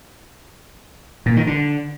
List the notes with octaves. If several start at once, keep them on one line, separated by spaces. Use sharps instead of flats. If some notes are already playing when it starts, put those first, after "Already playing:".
A#2
D#3
D3